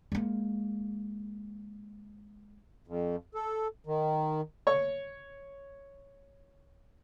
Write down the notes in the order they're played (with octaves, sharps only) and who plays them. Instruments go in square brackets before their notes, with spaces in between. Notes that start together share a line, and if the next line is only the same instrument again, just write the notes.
[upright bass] G#3 A#3
[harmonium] F2
A4
D#3
[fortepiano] C#5 C#6